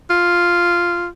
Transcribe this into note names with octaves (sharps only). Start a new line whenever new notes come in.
F4